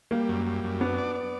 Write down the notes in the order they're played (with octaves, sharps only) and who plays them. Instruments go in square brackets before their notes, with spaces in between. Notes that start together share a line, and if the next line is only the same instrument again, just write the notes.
[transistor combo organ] G3 [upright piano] A#3
[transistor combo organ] F#2
G3
F#2
[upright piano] B3 [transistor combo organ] D4
[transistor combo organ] D5
D5